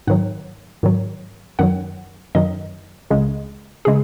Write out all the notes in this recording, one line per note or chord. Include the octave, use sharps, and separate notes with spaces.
G#2 D#3 F#3 F#5
G#2 D#3 F#3
F#2 D#3 F#3 F#5
F#2 D#3 F#3 D#5
C#2 C#3 G#3
C#3 G#3 G#4